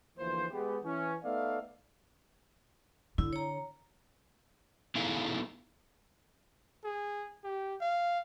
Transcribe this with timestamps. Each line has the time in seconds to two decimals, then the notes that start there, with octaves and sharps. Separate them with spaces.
0.18 D2 E3 F3 A#3 C5
0.52 G#3 B3 G4
0.84 E3 C#4
1.24 A3 B3 D#4 D5 E5 F5
3.18 D3 E4
3.33 C#5 A#5
4.95 B3 D#4 E4 G#4 A4 F5
6.84 G#4
7.44 G4
7.81 F5